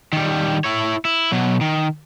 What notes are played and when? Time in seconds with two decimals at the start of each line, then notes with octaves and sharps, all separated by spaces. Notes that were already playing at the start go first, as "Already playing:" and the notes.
0.13 D#3 G3
0.64 E4 C#5
1.05 E4
1.32 B2 F#3
1.61 D#3